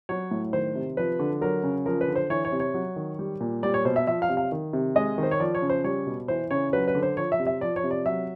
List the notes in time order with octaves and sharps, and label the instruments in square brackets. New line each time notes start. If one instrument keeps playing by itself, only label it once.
[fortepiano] F#3 C#5
A2
D#3 C5
C3
F3 B4
D3
F#3 A#4
C#3
F3 A#4
B4
D3
C5
E3 C#5
C#5
C3
C#5
F#3
D#3
G3
A#2
G3 D5
C#5
B2 C5
E5
F3 E5
F5
C3
F5
D#3
C3
G#3 D#5
D#3
C5
C#5
F3 D5
C#5
C#3
C5
G3 C#5
B2
E3 C5
C#3 C#5
F#3 B4
B4
D3
C5
F3 C#5
E5
C3
E5
F3 D5
C#5
C3
D5
F#3 E5